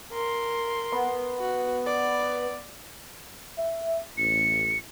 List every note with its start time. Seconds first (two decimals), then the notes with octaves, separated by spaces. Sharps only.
0.12 A#4 C6
0.92 B3
1.39 F#4
1.86 D5
3.58 E5
4.17 A1 C#7